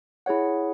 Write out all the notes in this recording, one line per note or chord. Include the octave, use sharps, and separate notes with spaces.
E4 G#4 C#5 F#5